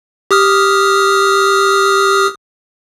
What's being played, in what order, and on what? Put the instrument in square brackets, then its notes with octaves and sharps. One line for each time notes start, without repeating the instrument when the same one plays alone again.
[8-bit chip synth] G4 D#6 F6